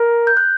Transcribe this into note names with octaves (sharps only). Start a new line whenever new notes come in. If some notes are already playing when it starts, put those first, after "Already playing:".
Already playing: A#4
G6
F#6